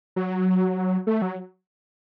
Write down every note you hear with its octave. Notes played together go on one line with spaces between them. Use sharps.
F#3
A3
F#3